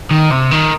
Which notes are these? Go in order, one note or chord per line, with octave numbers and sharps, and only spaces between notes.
D#3
C3
D#3